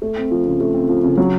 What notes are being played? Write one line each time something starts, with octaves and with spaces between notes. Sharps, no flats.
A3
C4
F3
C#3
A3
C4
F3
C#3
F#3